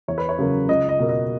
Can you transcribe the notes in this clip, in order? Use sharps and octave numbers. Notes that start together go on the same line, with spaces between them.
E2 C#5
B4
C#5
C#3 F#3 A#3
C#2 D#5
D#5
B2 A#3
D#5